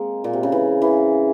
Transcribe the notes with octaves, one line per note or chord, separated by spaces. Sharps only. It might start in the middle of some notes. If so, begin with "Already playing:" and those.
Already playing: G#3 A#3 C4
A#2
C3
C#3
E3
E3